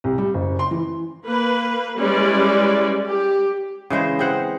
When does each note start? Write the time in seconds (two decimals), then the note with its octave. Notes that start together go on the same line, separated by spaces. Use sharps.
0.04 C2
0.18 G3
0.34 F#1
0.59 C6
0.71 E3
1.24 A#3 B4
1.99 G3 G#3 C#4 E4 B4 D5
3.06 G4
3.90 C#3 E3 G#3 C5
4.19 C4 G#4 C5 F#5